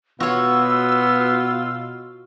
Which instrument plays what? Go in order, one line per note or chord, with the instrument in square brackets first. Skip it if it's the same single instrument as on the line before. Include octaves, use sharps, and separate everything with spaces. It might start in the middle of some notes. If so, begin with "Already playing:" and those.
[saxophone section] B2 F4 [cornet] B3 [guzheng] F#4 C#5 [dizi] E6